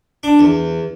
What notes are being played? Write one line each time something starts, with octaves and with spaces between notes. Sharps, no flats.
D4
E2